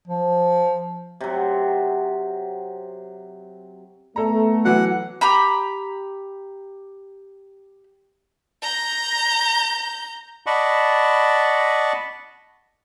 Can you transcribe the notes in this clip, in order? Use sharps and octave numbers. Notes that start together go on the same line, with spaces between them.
F3
C3 F#3
A3 B3 A4 A#5
E3 F#3 F#5
G4 A#5 B5
A#5 G6
D5 D#5 F#5 A5 B5 C#6